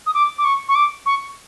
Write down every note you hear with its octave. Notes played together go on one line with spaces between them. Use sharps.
D#6
D6
D6
C#6
C#6
D6
C#6